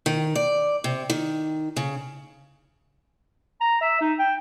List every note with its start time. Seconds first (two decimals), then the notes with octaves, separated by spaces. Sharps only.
0.06 D#3
0.35 D5
0.84 C3
1.10 D#3
1.76 C#3
3.61 A#5
3.82 E5
4.01 D#4
4.19 G5